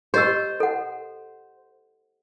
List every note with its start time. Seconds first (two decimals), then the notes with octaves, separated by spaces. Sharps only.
0.14 G4 C5 D#5 E6
0.60 A4 F#5